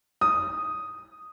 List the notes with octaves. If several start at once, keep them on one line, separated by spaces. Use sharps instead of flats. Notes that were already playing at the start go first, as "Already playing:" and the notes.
D#6